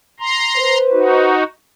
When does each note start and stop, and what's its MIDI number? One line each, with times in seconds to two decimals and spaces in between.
0.20 0.78 82
0.20 0.78 84
0.57 1.34 71
0.57 1.34 72
0.92 1.43 63
0.92 1.43 66